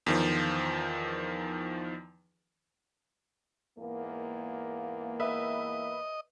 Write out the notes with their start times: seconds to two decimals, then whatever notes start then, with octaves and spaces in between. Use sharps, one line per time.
0.06 E2 D#3 F3
3.78 E2 G#2 A#3
5.20 B4 D#5 E5